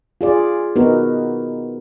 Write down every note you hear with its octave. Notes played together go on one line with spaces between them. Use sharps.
F4 G#4 D5
B3 D#4 F#4 A#4